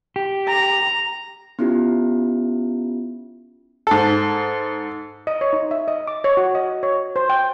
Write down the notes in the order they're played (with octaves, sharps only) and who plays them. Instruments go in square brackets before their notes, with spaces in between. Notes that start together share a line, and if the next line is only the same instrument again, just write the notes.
[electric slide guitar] G4
[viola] A#5
[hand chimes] B3 C#4 E4 F4 G4
[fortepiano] G#2 A4
[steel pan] D#5
C#5
D#4
E5
D#5
D6
C#5
F#4
D#5
C#5
C5
G5